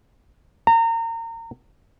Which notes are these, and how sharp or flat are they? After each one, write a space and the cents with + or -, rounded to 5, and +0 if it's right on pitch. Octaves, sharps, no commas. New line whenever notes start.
A#5 -30